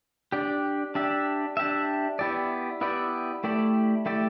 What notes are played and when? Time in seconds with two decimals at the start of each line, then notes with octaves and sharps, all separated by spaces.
0.32 D4 G4 D5
0.95 D4 G4 E5
1.57 D4 G4 E5
2.19 B3 E4 G4 D5
2.81 B3 E4 G4 D5
3.44 A3 E4 G4 D5
4.06 A3 E4 G4 D5